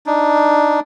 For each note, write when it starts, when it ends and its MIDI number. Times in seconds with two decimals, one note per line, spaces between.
0.06 0.80 62
0.06 0.80 63